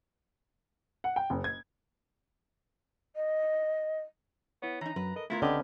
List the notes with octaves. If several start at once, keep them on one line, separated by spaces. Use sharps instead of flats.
F#5
G5
F#1
G#6
D#5
B3 E4 C#5
E3 D#4 A#5
F#2 F#3 B4
A4 A#4 D#5
A3 B3 E4 F4 A#4 G#6
C#2 D3 C4 C#4 G4 B4 C#5 D#5